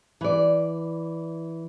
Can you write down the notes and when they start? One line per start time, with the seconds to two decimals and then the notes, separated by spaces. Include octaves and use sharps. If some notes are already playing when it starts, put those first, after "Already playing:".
0.21 E3 D5